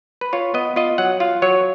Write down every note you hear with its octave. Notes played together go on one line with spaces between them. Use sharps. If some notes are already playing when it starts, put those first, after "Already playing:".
B4
F4 C#5
B3 D#5
F4 D#5
F#3 F#5
F4 F5
F#3 C#5